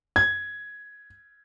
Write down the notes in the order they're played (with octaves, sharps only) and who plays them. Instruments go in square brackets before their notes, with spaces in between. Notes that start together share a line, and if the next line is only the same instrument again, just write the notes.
[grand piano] G#6